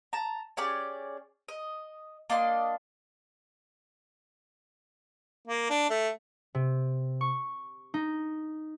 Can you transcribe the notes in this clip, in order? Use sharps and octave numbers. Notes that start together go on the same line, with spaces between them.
A5 A#5
C#4 G4 G#4 D5
D#5
A#3 D4 D#5 C6
A#3
D4
A3
C3
C#6
D#4